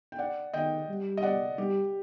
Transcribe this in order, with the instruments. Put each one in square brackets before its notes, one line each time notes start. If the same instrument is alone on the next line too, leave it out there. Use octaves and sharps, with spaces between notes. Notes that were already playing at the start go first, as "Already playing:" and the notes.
[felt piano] G5
D5 F#5
[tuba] D#3 [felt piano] D#5 G5
[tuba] G3
[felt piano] D#5
D5 F#5
[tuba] G3 [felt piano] G4